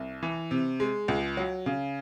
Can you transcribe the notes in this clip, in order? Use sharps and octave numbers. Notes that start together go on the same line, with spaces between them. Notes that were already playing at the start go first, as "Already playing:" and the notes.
Already playing: C2
E3
C3
G#3
C#2
F#3
C#3